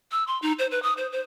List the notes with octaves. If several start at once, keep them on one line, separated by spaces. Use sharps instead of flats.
E6
C6
D#4
C5
B4
D#6
C5
C5